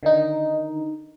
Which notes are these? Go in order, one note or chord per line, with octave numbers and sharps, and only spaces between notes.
D3 D#3 D#4